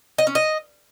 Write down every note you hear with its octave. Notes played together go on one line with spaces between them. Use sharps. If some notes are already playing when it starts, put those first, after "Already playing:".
D#5
C#4
D#5